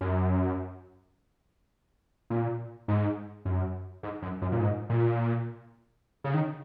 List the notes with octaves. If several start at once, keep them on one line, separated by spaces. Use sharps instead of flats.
F#2
A#2
G#2
F#2
G#2
F#2
F#2
A#2
G#2
A#2
C#3
D#3